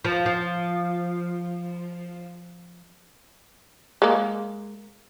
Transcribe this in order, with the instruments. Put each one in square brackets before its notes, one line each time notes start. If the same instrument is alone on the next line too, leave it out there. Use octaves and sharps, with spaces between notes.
[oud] F3
F3
[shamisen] G#3 A#3